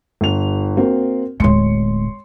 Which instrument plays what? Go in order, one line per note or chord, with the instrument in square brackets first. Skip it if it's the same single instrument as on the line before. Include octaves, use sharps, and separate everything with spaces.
[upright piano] G1 F7
A#3 C4 F#4
[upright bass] D1 G#3 [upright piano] C#5 C6 C#7